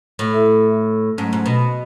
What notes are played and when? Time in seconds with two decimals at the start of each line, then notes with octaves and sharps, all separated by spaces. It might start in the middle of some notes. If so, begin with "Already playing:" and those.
0.19 A2
0.33 E4 A4 E5
1.18 G#2 F#3 A3 C#4
1.33 G#2
1.46 B2